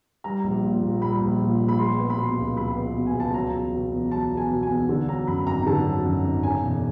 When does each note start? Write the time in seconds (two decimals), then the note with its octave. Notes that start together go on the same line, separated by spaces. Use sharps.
0.24 G3 A#5
0.44 A#1
0.63 A#2
0.82 A#1
1.02 G3 B5
1.21 A#1
1.41 A#2
1.60 A#1
1.68 B5
1.79 G#3 C6
1.99 B3
2.10 B5
2.18 B2 C6
2.37 C#2
2.57 G#3 B5
2.76 B3
2.95 B2
3.06 G#5
3.15 C#2
3.20 A5
3.34 F#3 A#5
3.53 E2
3.73 B2
3.92 E2
4.11 F#3 A5
4.31 E2
4.37 G#5
4.50 B2
4.63 G#5
4.69 E2
4.89 D3
5.08 F#3 A#5
5.27 F#2 B5
5.47 G#1 A#5
5.66 D3 A5
5.86 F#3
6.05 F#2
6.24 G#1
6.43 C#3 G#5
6.62 E1